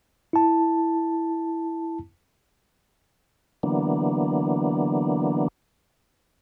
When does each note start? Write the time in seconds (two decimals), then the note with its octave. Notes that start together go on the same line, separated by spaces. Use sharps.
0.33 E4 A5
3.63 D3 E3 F#3 A#3 B3 D4